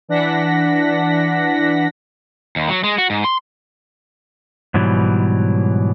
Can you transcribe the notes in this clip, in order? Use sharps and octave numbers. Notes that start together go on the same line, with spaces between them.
E3 D4 F#5 A#6 B6
D#2
F#3
G#3
F#4
G#2
C6
G#2 B2 E3 F#3 G3